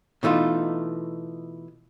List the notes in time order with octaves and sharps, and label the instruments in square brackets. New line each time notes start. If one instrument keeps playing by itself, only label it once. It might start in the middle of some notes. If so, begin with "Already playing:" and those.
[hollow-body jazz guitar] B2 E3 A3 D#4 F4